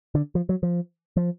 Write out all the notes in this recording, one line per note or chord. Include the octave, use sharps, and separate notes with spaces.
D3
F3
F#3
F3
F3